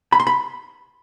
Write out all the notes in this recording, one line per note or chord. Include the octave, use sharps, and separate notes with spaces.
B5
C6
B5